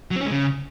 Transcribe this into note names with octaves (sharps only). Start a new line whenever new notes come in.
F#3
C4
C#4
G#3
C#3